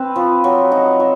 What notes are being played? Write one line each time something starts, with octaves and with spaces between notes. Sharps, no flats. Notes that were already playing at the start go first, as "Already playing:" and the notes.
Already playing: C4 B4
F3
F#3
D#4
F#3